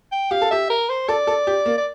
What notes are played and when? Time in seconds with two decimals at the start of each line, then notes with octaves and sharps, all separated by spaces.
0.12 G5
0.31 G4 F5
0.41 A4
0.51 G4 E5
0.70 A#4
0.89 C5
1.08 A4 D5
1.27 A4
1.47 G4
1.66 A#3
1.77 D5